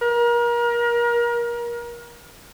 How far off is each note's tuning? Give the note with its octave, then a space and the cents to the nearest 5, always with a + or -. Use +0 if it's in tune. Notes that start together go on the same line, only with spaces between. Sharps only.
A#4 +30